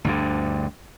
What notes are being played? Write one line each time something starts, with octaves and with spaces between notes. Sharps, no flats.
D2 G2 D3